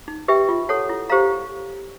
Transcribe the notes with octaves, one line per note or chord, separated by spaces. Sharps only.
D#4
G4 B4 E5 G5
F4
A4 C#5 F#5 A5
E4
G4 C5 F5 A#5